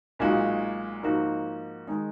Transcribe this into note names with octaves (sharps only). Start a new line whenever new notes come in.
B1 A#2 G#3 D#4 F#4
G#2 F3 A#3 D#4 F#4
D#3 G#3 D#4